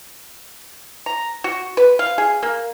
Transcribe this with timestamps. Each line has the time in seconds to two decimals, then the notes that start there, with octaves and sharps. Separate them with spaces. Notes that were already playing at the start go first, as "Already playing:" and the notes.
1.06 A#5
1.44 F#4
1.77 B4
1.99 F5
2.18 G#4
2.43 A#3